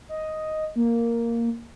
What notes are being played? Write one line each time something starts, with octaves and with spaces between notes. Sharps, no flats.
D#5
A#3